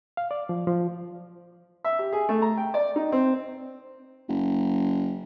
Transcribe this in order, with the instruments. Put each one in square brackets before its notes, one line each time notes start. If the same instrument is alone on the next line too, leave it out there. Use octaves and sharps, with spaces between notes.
[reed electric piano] F5
D5
F3
F3
[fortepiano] E5
G4
G#4
A3
A#5
G5
D5
D#4
C4
[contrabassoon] F#1